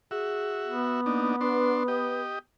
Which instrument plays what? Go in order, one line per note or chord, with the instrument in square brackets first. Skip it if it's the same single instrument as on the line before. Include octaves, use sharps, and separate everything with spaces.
[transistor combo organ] F#4 E5 [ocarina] G#4
[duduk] B3
[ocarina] A#3 [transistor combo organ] D4 D#4
[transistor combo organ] D4 C6 [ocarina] B4
[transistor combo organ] G4 D#5